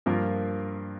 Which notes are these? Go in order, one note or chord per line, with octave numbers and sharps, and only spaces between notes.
G2 F3 A#3 F4 A#4